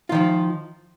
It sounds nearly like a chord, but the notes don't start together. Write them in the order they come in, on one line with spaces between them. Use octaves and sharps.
F4 D#3 F3